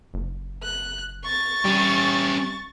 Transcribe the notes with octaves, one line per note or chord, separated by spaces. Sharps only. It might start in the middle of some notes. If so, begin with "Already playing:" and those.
F#1
F#6
C#6 A6
G3 C#4 G4